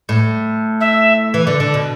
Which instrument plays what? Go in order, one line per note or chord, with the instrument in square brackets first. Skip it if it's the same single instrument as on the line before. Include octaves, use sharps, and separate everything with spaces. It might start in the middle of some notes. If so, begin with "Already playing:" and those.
[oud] A2
[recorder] E5
[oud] E3
D3
D3
B2